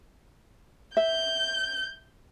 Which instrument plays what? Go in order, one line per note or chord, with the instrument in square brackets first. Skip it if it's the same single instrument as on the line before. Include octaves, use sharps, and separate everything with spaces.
[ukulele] E5 [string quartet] G6